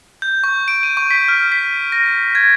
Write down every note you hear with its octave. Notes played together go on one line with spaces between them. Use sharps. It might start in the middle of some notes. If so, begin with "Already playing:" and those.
G6
C#6
D7
D#7
C#6
B6
F6
B6
A#6
G#6